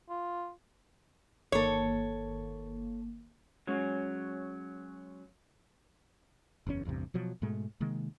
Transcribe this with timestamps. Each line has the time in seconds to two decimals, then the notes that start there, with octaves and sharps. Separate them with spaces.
0.10 F4
1.52 G1 D#3 A#3 A4 C#5
3.67 F#3 G#3 C#4
6.67 F#1 E2 A2 C#4
6.85 A1 E2 G2 C3
7.14 B2 F3 F#3
7.42 G#2 B2 G#3 A3
7.80 C3 D#3 G#3 A#3